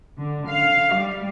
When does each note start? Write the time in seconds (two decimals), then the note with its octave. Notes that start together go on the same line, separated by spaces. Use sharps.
0.18 D3
0.48 F5
0.94 G3